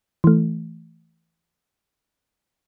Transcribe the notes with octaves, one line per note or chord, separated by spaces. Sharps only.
E3 A3